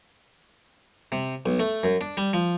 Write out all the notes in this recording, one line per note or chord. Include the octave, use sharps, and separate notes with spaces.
C3
B1
A3
F#2
D4
G3
F3